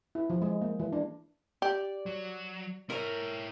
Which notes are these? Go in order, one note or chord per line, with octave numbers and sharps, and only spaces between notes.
E4
F3
G#3
A#3
E3
D4
G4 D5
F#3
E4 A#4 C#5 A#5